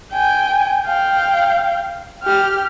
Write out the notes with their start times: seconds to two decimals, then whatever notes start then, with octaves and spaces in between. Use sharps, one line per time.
0.12 G5 G#5
0.83 F5 G5
2.23 G4 F6